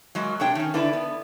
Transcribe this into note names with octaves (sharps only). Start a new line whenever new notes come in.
F#3 G#3 A#3
C3 A3 D4 C#5 G5
D#3 C#4
D3 D4 E4 B4
B3